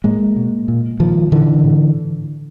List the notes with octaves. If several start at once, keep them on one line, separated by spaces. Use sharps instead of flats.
A2 G#3 A#3
B2
A#2
A#2 D#3 F3
A#2 D3 E3
A2